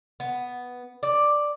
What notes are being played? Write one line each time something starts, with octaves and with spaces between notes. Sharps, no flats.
B3
D5